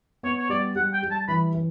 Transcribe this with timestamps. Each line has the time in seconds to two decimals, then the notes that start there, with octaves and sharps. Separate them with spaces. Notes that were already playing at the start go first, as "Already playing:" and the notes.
0.23 B3 C#5
0.38 C#5
0.49 G3 D5
0.76 G3 F#5
0.93 G5
1.03 G3
1.11 A5
1.28 E3 B5
1.54 E3